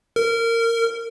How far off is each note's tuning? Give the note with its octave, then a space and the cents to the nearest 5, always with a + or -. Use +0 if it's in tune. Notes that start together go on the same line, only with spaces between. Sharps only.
A#4 -20